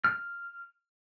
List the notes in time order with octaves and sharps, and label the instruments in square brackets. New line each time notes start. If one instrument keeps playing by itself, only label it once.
[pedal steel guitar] F6